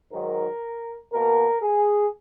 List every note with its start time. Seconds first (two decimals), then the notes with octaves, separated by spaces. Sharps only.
0.12 G#2 D#3 F#3 A#4
1.12 B2 A#3 A#4
1.62 G#4